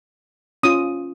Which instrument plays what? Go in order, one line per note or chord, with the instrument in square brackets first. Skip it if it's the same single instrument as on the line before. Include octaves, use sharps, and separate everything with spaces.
[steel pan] C#4 F4 D#6